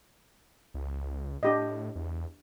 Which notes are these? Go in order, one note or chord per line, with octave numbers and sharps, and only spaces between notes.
C#2
A2 D4 G4 D#5
E2